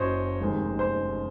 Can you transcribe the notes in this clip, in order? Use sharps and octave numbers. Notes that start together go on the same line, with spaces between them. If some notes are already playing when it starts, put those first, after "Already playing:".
Already playing: F#1 F#2 C#3 F#3 C5 C#5 D#5
F1 D#2 D#3 G#3 C4
C5